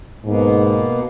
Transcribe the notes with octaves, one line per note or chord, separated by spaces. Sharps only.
G#2 B2 A#3 B3